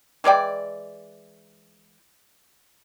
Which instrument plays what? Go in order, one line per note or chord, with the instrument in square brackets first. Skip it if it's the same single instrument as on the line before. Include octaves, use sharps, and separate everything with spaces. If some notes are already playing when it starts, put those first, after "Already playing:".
[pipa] E3 G#3 D5 G5